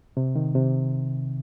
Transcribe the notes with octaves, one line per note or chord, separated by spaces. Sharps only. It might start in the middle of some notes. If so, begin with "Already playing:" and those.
C3
D#3
C3